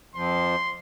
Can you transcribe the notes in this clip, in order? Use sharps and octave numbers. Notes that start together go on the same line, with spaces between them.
F2 F3 C6